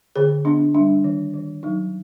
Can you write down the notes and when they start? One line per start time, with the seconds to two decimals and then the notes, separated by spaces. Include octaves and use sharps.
0.16 D3 G#4
0.45 B3 D4
0.74 G3 D4
1.04 D#3
1.34 D#3
1.63 F#3 D#4